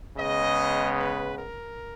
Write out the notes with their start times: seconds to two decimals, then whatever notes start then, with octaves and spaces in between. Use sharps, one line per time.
0.17 C#3 G#3 B3 D#5
0.98 B4
1.38 A#4